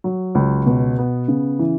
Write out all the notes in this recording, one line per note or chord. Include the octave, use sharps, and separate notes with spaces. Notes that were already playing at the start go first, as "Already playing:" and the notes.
F#3
C#2
B2
B3
C#3
E3